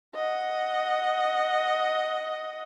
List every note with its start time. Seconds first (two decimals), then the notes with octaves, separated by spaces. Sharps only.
0.15 D#5 F#5